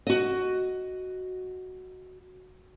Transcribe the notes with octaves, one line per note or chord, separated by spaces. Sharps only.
F#4 D#5